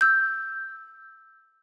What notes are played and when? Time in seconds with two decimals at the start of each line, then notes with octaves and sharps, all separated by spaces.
0.01 E6 G6